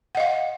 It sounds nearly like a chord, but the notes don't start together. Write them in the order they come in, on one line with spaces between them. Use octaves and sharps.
F#5 D#5 F5